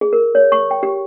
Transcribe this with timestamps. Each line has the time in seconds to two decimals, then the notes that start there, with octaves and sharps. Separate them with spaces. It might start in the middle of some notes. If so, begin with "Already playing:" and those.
0.01 G#4
0.13 A#4
0.35 C#5
0.52 C#6
0.71 G5
0.83 G4